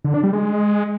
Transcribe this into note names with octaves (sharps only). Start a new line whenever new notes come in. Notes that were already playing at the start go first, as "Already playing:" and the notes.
D3
D4
G3
G#3